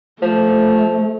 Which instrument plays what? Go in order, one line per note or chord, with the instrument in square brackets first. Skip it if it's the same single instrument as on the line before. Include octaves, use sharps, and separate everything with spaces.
[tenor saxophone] F3 [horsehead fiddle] A3